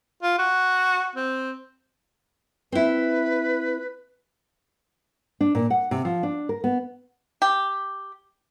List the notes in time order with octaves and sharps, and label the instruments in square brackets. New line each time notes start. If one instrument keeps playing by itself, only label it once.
[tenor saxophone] F4
F#4
C4
[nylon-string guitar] C4 E4 [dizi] B4
[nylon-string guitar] D4
A#2
F#5
C3
F3
D4
A#4
B3
[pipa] G4